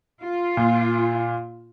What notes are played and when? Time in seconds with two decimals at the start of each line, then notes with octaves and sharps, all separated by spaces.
0.22 F4
0.57 A#2